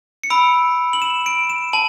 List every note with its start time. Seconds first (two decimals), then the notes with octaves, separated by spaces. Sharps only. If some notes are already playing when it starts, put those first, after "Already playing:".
0.23 C#7
0.30 B5 E6 D7
0.93 F#7
1.02 E7
1.26 D7
1.50 E7
1.73 A5 F#7